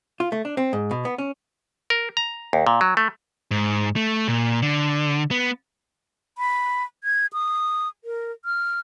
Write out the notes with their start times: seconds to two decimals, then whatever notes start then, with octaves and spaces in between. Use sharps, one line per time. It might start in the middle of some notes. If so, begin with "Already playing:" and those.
0.20 F4
0.32 A3
0.45 D4
0.57 C4
0.73 G#2
0.91 B2
1.05 B3
1.18 C#4
1.90 A#4
2.17 A#5
2.53 D#2
2.67 A#2
2.81 F#3
2.97 A3
3.51 G#2
3.96 A3
4.28 A#2
4.62 D3
5.31 B3
6.38 B5
7.04 G#6
7.33 D#6
8.04 A#4
8.45 F6